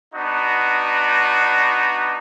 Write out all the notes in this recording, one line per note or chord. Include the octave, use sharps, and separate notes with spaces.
B3 D4 D#4 F#4